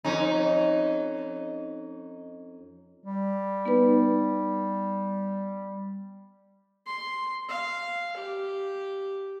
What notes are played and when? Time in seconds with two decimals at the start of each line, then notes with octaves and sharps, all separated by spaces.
0.05 F2 C#4 D#4
3.04 G3
3.66 B3 D#4 B4
6.87 C6
7.49 F5
8.17 G4